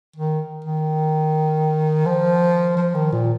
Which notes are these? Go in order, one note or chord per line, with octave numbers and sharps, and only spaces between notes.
D#3
D#3
F3
F3
D#3
A#2